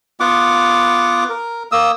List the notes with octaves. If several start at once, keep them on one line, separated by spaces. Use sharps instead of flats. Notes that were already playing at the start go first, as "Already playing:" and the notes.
B3 F4 F#5 D6
A#4
A#3 D#6 E6